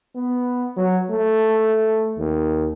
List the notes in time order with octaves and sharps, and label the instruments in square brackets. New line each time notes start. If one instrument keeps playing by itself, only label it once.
[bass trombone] B3
F#3
A3
D#2